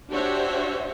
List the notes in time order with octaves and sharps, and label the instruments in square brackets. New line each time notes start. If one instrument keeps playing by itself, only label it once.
[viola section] D4 F#4 G4 C5 C#5 E5